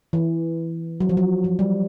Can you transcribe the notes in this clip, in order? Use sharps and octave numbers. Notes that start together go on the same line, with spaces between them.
E3
F#3
F3
F#3
F3
G3